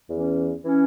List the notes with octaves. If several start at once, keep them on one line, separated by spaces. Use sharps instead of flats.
E2 E3 C#4
E3 C#4